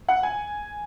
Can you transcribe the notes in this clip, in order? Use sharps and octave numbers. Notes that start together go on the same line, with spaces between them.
F#5
G#5